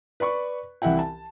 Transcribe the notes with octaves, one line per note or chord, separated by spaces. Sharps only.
B4 D5 B5 C#6
C2 E3 E4 E5 F#5 G5
A5